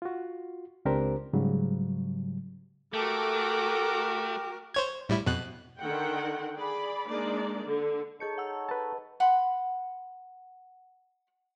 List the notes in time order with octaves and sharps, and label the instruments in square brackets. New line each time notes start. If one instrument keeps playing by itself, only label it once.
[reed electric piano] F4 F#4
C#2 C4 D4 G4 A#4 C5
G#2 C#3 F#3 G3
[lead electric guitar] A3 [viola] F#4 A#4 [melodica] G4 [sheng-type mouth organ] A4 D6
[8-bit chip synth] C5 C#5 G#6
A2 G3 E4
F2 B2 F#6
[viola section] D3 D#3 F#5 G5
G#4 D5 B5
G#3 A#3 D4 D#4 D5
D3
[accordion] D#4 A4 C#5 [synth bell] G#4 G6 C#7
[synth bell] F#5 E6
[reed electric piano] B4 A5
[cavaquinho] F#5 B5 C6